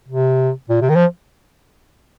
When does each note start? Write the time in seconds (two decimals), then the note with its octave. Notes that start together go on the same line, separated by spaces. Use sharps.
0.08 C3
0.69 A#2
0.82 C3
0.89 D#3
0.96 F3